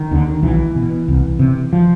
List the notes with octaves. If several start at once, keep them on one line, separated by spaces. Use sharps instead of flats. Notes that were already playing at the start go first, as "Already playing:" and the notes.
Already playing: D#3
D#2 D3
B1 E3
B2
C2
C3
F3